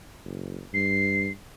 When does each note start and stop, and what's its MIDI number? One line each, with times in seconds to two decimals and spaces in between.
0.24 0.61 30
0.73 1.29 43
0.73 1.30 96